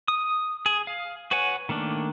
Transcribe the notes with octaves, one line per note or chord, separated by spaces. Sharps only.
D#6
G#4
F5
F#4 B4 C#5 F#5 G#5
D#3 A3 A#3 D4